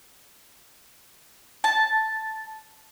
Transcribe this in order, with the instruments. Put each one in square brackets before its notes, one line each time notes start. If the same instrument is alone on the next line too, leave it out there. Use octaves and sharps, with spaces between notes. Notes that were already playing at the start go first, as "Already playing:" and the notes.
[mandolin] A5